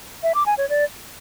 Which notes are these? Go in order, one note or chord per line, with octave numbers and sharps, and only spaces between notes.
E5
D6
G#5
C#5
D5